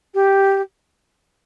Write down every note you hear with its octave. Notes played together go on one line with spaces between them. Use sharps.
G4